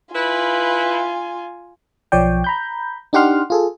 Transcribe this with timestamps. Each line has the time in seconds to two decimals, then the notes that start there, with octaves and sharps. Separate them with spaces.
0.15 E4 F4 B4 G#5
2.12 B1 F3 C#5 D5 G5
2.44 A#5 B5 G6
3.13 D4 D#4 G4 F#5 C6 F6
3.50 F4 G#4 A4